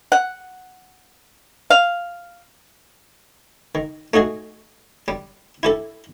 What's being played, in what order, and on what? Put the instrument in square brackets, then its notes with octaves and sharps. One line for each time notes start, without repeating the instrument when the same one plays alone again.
[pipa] F#5
F5
[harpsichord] D#3
A3 D#4 F#4 G#4
G3
E4 G4 A4